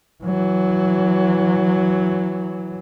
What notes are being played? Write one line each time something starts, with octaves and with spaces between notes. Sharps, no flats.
E3 F#3